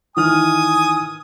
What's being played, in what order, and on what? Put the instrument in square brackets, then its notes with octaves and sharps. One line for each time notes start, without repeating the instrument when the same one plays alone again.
[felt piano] D#3 E3 F6 [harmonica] G#5 D#6